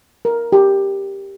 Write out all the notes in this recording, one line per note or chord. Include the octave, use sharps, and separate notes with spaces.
A#4
G4